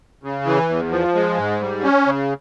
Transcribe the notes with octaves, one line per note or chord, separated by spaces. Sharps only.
C#3
E3
E2
F3
G#3
G#2
G3
C#4
C#3